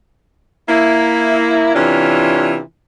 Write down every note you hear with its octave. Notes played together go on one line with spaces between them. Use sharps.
A#3 E4
C3 E3 C#4 D4 F4